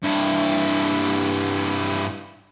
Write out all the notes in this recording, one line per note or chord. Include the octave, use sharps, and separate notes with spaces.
G2 E4